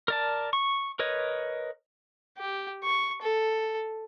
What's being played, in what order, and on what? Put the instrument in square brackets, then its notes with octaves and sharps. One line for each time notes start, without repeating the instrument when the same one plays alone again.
[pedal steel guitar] A#4 D5 A5
C#6
A#4 B4 C#5 D#5
[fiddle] G4
C#6
A4